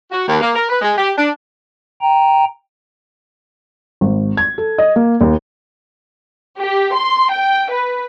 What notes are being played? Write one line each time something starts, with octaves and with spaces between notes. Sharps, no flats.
F#4
D#2
A#3
A#4
B4
G#3
G4
D4
G5 A#5
G#1
G#6
A4
D#5
A#3
D#2
G4
C6
G5
B4